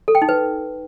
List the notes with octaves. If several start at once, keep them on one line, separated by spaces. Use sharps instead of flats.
A4
G5
D#4
B4